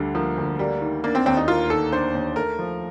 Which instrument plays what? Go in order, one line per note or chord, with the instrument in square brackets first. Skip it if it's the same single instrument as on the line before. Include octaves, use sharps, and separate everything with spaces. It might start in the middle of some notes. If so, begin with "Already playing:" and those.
Already playing: [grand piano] D2 D3 G3
[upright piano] F3 [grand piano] A#3
[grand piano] D2
[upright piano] G3 [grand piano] A#3
[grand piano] D#3
[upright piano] A#3 [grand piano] D4
[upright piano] C4
[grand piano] D#2 [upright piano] C4
[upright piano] D#4
[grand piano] A#3 [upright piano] F4
[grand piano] D#3 [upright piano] A4
[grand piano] D4 [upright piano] C5
[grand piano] D#2
[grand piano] A3 [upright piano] A#4
[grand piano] F3